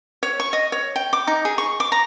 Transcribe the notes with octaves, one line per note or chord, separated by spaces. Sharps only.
C#5
C#6
D#5
C#5
G5
D6
D#4
G#4
C#6
D6
A#5